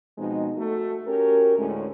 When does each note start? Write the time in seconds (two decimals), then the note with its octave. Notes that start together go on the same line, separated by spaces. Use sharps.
0.18 B2 F3 G#3 C4 D#4
0.57 A3 F#4
1.08 C#4 F#4 G4 A#4
1.57 D2 A2 G#3 A3 C#4